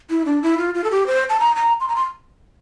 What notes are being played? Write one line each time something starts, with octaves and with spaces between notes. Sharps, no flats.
E4
D4
E4
F4
F4
A4
G4
C5
A5
A#5
A#5
C6
A#5
C6